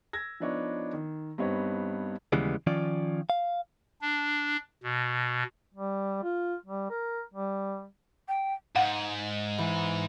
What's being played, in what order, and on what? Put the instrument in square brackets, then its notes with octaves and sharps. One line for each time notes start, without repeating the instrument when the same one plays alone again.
[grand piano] E6 G#6 A#6
F3 B3 D4 D#4 C#5
D#3
G2 B3 C4 D#4 C5 C#5
[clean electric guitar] D#2 C#3 E3 G3 G#3 B3
D#3 F3 C#4 F4 D5
F5
[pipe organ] D4
B2
[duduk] G3
F4
G3
A#4
G3
[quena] G5
[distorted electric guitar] G#2 [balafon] F5 F#5
[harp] E3